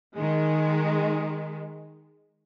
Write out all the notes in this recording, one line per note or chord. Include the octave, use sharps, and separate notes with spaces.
D#3 G#3